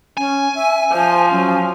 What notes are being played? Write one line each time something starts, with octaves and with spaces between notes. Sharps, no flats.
C#4 G#5
E5
F3 C5
F#3 C#4